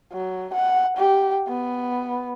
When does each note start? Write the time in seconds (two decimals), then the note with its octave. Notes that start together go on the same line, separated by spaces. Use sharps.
0.13 F#3
0.54 F#5
0.97 G4
1.48 B3